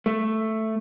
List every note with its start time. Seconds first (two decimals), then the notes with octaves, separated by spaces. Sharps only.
0.06 A3